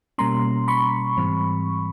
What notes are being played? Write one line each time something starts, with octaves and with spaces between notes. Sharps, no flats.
B2 G3 A#3 C#4 A#5 C6
B5 C#6
G#2 E3 G3 C4